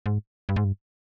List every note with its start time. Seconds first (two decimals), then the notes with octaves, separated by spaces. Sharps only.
0.06 G#2
0.49 G2
0.56 G#2
0.64 G2